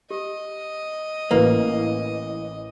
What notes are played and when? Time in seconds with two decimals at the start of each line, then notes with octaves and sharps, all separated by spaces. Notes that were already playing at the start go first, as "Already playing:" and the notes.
0.11 G4 D#5
1.31 A1 E3 A#3 B4